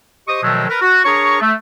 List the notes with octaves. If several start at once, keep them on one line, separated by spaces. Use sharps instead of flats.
G4 C5 D#5 C#6 D#6
B2 D#3 F3 F#3 G#3 A3
A#4 B4
F#4
D4 G#4 A#4 C#5 A#5 C#6
A3